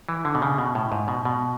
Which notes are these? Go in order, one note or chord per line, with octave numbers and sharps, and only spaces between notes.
E3
D3
B2
C#3
B2
A2
G#2
B2
B2